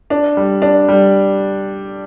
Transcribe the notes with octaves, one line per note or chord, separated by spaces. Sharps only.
D4
G3
D4
G3